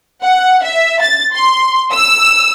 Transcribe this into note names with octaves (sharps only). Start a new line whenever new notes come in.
F#5
E5
A6
C6
E6